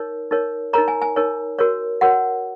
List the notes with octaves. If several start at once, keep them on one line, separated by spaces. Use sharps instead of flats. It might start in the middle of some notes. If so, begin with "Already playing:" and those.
Already playing: D#4 A#4 C#5
D#4 A#4 C#5
D#4 A#4 C#5 A#5
G#5
G#5
D#4 A#4 C#5
F#4 A#4 C#5
F#4 A#4 C#5 F#5